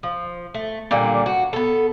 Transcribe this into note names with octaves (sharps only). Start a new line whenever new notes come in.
F3
A3
A#2 D3 G3 A#3
F#4
B3 A4